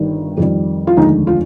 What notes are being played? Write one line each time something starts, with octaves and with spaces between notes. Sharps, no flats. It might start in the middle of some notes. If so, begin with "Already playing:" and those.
Already playing: G1 G2 D#3 G3
F2 D#3 G3
F4
F1 D#2 D3 G#3 D#4
F4